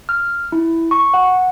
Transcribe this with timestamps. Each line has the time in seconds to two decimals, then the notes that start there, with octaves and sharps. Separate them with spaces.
0.09 F6
0.52 E4
0.91 C#6
1.14 F#5